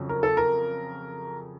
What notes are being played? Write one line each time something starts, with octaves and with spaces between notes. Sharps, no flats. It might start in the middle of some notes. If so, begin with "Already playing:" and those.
Already playing: F2 C#3 F#3
A#4
A4
A#4